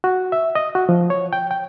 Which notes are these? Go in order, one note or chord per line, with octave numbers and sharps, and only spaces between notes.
F#4
E5
D#5
F#4
F3
C#5
G5
G5